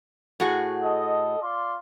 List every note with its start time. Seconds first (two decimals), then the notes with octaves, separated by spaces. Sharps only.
0.40 A2 F#4 G#4
0.83 A4 D#5
1.42 F4 D5 C6